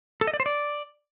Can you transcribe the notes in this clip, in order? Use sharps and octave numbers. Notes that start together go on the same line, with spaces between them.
A4
D#5
D5
C5
D5